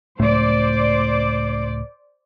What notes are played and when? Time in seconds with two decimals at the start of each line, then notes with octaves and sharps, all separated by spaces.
0.20 C#2 A2 A3 C5 D5